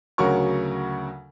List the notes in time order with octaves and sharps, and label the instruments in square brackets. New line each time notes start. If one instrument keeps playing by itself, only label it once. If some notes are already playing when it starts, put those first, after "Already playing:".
[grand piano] D2 C#3 F#3 F#4 A#4 C#6